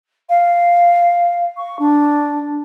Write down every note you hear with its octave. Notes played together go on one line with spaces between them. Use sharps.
F5
C#6
D4